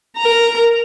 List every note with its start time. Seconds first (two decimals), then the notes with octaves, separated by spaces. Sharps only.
0.18 A#4 A#5